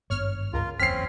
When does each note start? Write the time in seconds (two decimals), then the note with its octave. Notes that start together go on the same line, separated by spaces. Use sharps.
0.10 G#1 G2 B3 C#5 F6
0.53 C#2 F4 A#4
0.80 F#1 E2 C4 C#4 F6 B6 C7